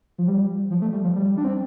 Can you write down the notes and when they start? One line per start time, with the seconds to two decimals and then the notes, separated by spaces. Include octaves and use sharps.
0.18 F3
0.27 G3
0.71 F3
0.82 A3
0.93 G3
1.04 F3
1.16 G3
1.37 D4
1.44 C4